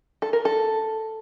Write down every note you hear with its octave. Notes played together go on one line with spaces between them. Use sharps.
A4
A#4
A4